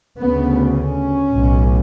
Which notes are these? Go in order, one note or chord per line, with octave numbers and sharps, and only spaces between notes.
D2 C#3 B3
C#4
B1 A2